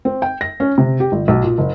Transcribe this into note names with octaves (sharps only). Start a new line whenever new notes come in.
C4
G5
A#6
C#4
C3
G4
G1
B1
A#2
F#1